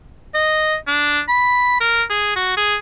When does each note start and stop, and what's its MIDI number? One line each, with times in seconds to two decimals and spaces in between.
0.35 0.76 75
0.87 1.20 62
1.28 1.80 83
1.80 2.04 70
2.10 2.36 68
2.36 2.52 66
2.57 2.76 68